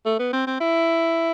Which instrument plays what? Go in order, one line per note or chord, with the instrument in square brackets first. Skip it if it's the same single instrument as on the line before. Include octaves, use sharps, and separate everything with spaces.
[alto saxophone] A3
B3
C4
C4
E4